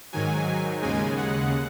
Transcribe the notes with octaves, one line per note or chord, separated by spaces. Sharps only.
G#2 D#3 F#3 G#5
D#2 C#3 G#3 G#5
F#5